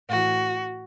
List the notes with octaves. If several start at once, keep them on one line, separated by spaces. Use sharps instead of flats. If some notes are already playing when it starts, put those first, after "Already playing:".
A2 E3 F#4